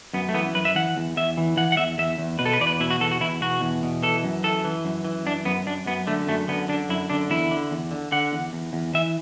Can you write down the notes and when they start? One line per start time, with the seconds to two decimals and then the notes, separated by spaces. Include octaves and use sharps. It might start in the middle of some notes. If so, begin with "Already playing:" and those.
0.14 F#2 B3
0.29 A3
0.34 E3 B3
0.55 F#2 B4
0.65 E5
0.75 E3 F#5
0.97 E2
1.17 E2 E5
1.37 E3
1.57 E3 F#5
1.72 F#5
1.77 E2 E5
1.98 E2 E5
2.18 E2
2.39 B2 B4
2.46 A4
2.53 B4
2.60 E2 D5
2.67 B4
2.80 B2 E4
2.91 F#4
3.00 E2 A4
3.11 F#4
3.20 E2 E4
3.41 B2 F#4
3.61 E2
3.83 B2
4.03 E3 A4
4.24 F#2
4.43 E3 A4
4.65 E3
4.85 F#2
5.05 E3
5.26 F#2 D4
5.45 F#2 B3
5.66 F#2 D4
5.86 F#2 B3
6.07 D3 A3
6.28 F#2 A3
6.48 D3 B3
6.68 D3 D4
6.89 F#2 E4
7.10 D3 D4
7.30 E2 E4
7.51 D3
7.71 E2
7.91 D3
8.12 D3 F#5
8.32 E2
8.53 E2
8.73 E2
8.94 E3 E5